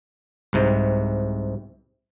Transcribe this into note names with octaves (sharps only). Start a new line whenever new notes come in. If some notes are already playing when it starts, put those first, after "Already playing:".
C2 G#2 C3